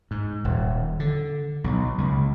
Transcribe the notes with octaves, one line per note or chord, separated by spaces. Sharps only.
G#2
D#1
D3
B1
C#2